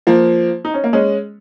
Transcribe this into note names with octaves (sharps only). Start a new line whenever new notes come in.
F3 A#3
D#4
C#4
A#3
G#3 C#4